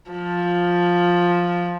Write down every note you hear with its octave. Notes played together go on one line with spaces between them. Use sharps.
F3